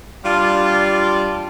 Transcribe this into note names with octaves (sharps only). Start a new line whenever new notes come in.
G3 D4 F4